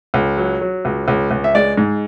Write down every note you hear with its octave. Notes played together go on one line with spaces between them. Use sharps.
C#2
F#3
F#3
C#2
C#2
C#2
E5
G#3 D5
G#2